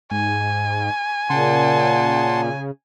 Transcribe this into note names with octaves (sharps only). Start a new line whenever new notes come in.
G#2 G#5
A#2 C#3 F#5 A5 C6